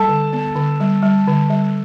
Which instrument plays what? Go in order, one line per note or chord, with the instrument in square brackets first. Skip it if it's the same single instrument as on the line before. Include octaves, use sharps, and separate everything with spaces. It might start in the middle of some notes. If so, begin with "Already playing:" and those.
Already playing: [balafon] G3 [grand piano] A4 A5
[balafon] D3
B3
D3
G3
G3
D3
G3